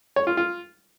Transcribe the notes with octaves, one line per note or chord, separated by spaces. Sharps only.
C#5
F4
F4